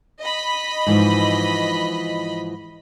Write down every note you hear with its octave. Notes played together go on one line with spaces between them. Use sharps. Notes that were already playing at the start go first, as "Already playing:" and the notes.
D#5 B5
G#2 E3 F3